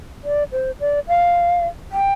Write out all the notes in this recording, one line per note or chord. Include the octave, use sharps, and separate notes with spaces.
D5
C5
D5
F5
G5